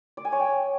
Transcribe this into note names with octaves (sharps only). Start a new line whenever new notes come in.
D5
G#5
C#5
G5